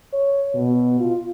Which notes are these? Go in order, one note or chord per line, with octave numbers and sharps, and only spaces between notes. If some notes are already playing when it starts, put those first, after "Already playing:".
C#5
B2
F4